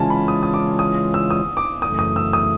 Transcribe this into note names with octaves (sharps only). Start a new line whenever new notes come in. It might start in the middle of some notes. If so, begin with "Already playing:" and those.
Already playing: C#3 E3 G#3 C#4 F4 G#5 A5
B5
D#6
D#6
D6
D#6
E6
D#6
D6
F#2 C#3 E3 A3 D#6
D#6
E6
D#6